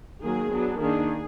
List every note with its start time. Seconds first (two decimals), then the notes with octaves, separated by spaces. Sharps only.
0.22 D#3 F#3 A#3 G#4
0.51 F#3 B3 D4
0.79 D#3 A#3 D4 G#4